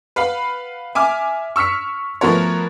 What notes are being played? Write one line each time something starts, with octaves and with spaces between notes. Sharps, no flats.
B4 F5 F#5 B5
E5 G#5 D6 F6
C#6 E6 F6 B6 C#7
F3 A3 B3 F#4 A#4 C#5